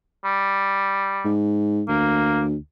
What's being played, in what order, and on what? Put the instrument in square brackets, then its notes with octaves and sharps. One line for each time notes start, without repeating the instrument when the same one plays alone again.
[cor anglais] G3
[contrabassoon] G#2
[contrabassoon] D2 [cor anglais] A#3